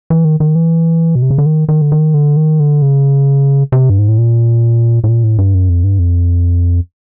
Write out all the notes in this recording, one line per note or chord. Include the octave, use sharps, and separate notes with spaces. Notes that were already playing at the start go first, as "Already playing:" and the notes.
E3
D#3
D#3
E3
B2
C3
C#3
D3
D#3
D#3
D3
D#3
D3
D#3
D3
C#3
C3
G2
G#2
A2
A#2
A2
A#2
A2
G2
F#2
F2
G2
F2